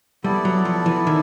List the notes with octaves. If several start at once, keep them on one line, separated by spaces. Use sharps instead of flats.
G3 B3 E4 A4 D5
F#3
F3
E3
D#3